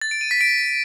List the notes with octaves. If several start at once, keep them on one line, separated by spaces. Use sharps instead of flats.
A6
D7
D#7
B6
D7